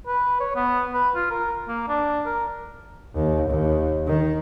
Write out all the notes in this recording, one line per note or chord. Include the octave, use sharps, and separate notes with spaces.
B4
C#5
B3
B4
F4
A#4
A#3
D4
A#4
D#2
D#2
D#3